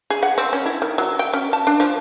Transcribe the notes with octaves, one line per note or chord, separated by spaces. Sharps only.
G#4
F#5
C4
C#4
E4
D#3
F#3
G5
C#4
A5
D4
F3